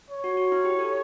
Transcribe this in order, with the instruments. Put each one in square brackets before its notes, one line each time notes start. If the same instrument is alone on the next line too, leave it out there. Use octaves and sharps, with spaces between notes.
[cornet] C#5
[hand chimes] F#4
F#4
E4
G4
A4